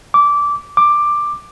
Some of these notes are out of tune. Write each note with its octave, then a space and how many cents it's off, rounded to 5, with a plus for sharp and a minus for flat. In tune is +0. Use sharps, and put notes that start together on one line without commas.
D6 -15
D6 +10